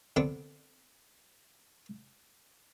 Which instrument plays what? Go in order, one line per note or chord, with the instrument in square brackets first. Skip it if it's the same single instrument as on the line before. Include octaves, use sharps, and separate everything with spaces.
[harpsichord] D3 B3 C4 D4